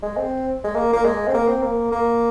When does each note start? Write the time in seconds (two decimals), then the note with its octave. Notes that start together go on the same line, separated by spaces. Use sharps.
0.03 G#3
0.17 C4
0.64 G#3
0.76 A#3
0.93 A#3
1.05 G#3
1.28 C4
1.34 A#3
1.48 C4
1.63 A#3
1.92 A#3